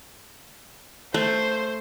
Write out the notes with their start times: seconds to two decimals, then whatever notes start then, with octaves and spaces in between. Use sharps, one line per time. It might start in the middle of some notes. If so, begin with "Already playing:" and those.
1.14 A3 C5